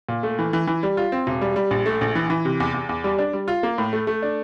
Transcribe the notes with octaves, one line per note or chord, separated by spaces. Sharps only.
A#2
A3
E3
E3
E3
G3
F4
C4
E1
G3
G3
A#1
A3
A#1
E3
E3
C3
E2
E2
E2
G3
D4
G3
F4
A#3
A2
A3
A3
D4